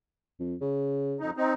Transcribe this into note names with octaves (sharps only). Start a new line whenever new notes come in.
F2
C#3
F2 D#4
C4 D#4